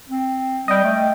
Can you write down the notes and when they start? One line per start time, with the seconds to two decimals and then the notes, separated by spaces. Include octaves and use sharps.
0.09 C4
0.68 G3 D#5 G5
0.84 A3